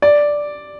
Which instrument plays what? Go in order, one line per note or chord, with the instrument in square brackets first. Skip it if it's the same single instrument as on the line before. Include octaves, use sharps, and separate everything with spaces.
[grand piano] D5